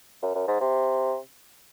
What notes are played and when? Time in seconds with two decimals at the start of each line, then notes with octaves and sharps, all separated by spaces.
0.22 F#2
0.35 F#2
0.48 G#2
0.60 C3